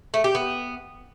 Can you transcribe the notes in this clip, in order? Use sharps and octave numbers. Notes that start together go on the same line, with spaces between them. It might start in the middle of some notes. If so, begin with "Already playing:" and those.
A3
G4
B3